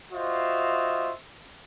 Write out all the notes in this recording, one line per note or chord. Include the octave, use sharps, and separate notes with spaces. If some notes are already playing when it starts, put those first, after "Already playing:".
F4 F#4 C5 D#5 E5